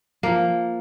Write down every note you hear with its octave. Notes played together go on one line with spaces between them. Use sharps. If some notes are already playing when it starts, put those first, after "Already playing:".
F3 A#3